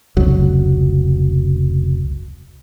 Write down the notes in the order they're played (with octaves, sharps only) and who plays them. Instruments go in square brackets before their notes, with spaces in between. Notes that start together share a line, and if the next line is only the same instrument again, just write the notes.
[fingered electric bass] F1 C#2 F#3